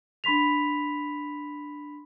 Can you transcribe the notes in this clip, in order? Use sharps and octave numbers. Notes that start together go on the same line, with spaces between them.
D4 B5 C6 B6 F7